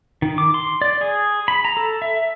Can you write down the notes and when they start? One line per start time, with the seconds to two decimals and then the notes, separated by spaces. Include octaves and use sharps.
0.22 D#3
0.38 D6
0.54 C6
0.81 D5
1.01 G#4
1.48 B5
1.65 A#5
1.77 A4
2.02 E5